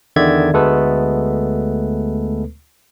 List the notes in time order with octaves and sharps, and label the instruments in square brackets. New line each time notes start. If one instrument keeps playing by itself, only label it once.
[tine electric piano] E2 D3 D#3 D5 E5 G#6
D2 G#3 A3 B3 A4 B4